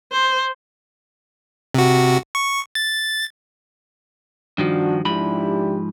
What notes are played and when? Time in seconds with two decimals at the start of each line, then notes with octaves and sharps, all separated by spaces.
0.12 C5
1.74 C3 F#4
2.35 C#6
2.75 A6
4.58 G2 D#3 F3 D4 F#4
5.05 G#2 F3 D4 E4 G4 B5